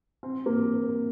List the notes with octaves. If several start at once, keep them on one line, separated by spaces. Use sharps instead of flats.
C4
A#3